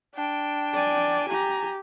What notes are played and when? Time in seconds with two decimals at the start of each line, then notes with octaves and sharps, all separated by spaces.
0.15 D4 G5
0.73 D5 G#5
1.30 G4 G#5 A#5